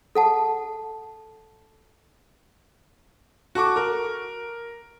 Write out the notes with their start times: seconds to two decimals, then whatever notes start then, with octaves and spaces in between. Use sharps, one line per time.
0.15 A4 F#5 A5
3.55 F#4 A4 C#6 D6
3.76 A#4